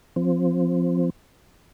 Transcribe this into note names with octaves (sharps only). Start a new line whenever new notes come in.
F3 C4